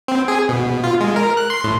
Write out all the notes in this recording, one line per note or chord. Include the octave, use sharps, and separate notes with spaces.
C4
G#4
B2
F4
G#3
A#4
F#6
C6
A2